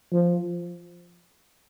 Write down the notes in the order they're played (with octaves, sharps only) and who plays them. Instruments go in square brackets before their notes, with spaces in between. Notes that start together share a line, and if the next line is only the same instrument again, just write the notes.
[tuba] F3